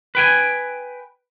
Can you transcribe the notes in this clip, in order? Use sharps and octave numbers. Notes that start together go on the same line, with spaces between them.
B4 G5 G#5